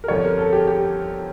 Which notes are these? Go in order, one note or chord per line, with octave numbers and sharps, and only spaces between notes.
A#4
G1 F2 D3 G3 C#5
A#4
A4
G4
G4